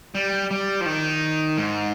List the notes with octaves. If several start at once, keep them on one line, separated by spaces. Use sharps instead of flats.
G3
G3
F3
D#3
G#2